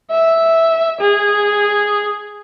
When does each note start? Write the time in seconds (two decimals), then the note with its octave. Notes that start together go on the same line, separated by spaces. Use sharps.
0.11 E5
1.01 G#4